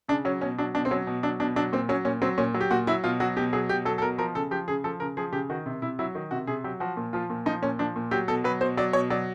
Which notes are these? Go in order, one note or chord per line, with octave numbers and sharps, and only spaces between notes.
C#3 D4
F#3 C#4
B2 C#4
F#3 D4
B2 D4
C4
F#3 C#4
B2
F#3 D4
B2 D4
F#3 D4
A#2 C4
F#3 C#4
A#2 C#4
F#3 C4
A#2 C#4
F#3
G4
A#2 F#4
F#3 E4
B2 F4
F#3 F#4
B2 G4
F#3 G#4
B2 G4
F#3 A4
A4
B2 A#4
F3 A#4
C#3 A4
F3 G4
C#3 G#4
F3 A4
C#3 A#4
F3 G#4
C#3 G4
D#3 F#4
C3
C3 E4
F#3 E4
D#3
C3 F#4
C3 G#4
F#3 G4
F3 F#4
A#2
F3 F4
A#2
F3 D#4
A#2 C#4
F3 D4
A#2
F#3 G4
B2 A4
F#3 B4
B2 C5
F#3 D5
B2 C#5
F#3 D5